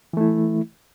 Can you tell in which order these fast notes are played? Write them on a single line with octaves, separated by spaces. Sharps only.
E3 A3 E4